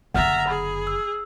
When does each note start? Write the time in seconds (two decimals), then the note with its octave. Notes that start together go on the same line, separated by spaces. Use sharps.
0.14 F#1 D3 E5 F#5 A#5 F6 A6
0.47 G#4 B5
0.87 E6